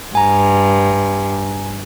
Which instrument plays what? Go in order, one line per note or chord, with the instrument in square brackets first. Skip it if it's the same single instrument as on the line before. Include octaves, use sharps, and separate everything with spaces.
[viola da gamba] G2 [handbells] G#5 A#5